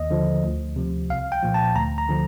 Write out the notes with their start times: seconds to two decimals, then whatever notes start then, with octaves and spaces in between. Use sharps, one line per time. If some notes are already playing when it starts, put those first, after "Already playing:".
Already playing: D#2 D#5
0.10 D3 F3
0.43 D2
0.76 C3 F3
1.10 C2 F5
1.32 G5
1.43 A#2 F3
1.54 A5
1.76 D2 A#5
1.98 A#5
2.09 D3 F3